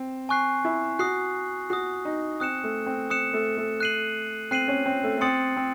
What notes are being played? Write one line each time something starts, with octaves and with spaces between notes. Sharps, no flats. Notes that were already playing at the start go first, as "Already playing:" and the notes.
Already playing: C4
G#5 C#6 F#6 C7
E4
F#4 D#6 F#6 C7
F#4 D#6 F#6 C7
D#4
C4 D#6 F#6 C#7 E7
A3
C4
C4 D#6 F#6 C#7 E7
A3
A3
F#6 C7 D#7 F#7
C4 F#6 C7 D#7 F#7
C#4
C4
A3
A3
C4 C6 D#6 A6 C#7 F#7
C4